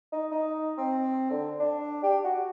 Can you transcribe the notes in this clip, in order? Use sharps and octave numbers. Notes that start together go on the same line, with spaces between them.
D#4
D#4
C4
D3
D4
G4
F#4